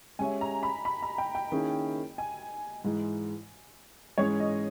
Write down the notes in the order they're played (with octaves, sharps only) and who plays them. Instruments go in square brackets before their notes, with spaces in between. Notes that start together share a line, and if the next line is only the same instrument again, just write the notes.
[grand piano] G#3 C#4 G4 C#5 E5 [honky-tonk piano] G#5
[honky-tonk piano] A#5
B5
B5
A#5
G5
G5
[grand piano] D#3 A#3 C#4 E4 G#4
[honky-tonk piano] G#5
[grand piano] G#2 E3 G#3
[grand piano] G#2 E3 G#3 C#4 G#4 [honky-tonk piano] C#5
[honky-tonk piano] D#5